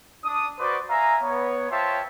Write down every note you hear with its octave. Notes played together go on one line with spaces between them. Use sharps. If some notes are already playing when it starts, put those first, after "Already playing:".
D4 D#6
F#4 B4 C5 D5
E5 F5 G#5 A#5
B3 C#5
F4 C5 C#5 E5 G5 A5